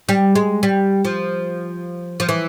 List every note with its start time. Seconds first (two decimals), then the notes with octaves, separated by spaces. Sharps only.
0.09 G3
0.35 G#3
0.63 G3
1.05 F3
2.20 F3
2.29 E3